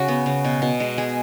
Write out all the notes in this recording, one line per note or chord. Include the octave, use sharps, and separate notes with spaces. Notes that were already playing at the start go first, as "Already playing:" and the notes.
Already playing: C#3 F#4
B3
C#3
B2
B2
G#3
G#3 G#4